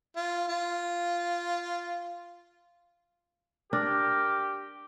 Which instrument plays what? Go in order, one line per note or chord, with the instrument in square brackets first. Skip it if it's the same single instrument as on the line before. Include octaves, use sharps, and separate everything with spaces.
[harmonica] F4
F4
[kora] D4 [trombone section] G4 [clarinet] A#4